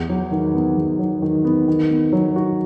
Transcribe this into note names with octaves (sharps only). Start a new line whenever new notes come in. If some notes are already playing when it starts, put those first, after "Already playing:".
Already playing: E2
F#3
D#3
B3
E2
F#3
D#3
B3
D#3
B3
F#3
F#4